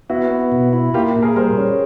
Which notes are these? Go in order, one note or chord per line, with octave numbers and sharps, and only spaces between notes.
B3 E4 F#4
B3
B2
E4
A#3 F4 G4
A#2
G#4 A#4
G3 A#4 C5
C#4